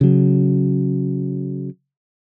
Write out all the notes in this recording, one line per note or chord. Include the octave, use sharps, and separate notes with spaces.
C#3 F#3